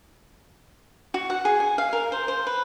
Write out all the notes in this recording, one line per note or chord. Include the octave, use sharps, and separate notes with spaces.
F#4
F#5
G#4
G#5
F5
A#4
C5
C5
B4